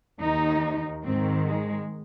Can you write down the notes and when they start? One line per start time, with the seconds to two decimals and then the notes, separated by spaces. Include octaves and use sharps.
0.20 D#2 D#3 D#4
1.04 G#2 D#3 C4
1.45 G#3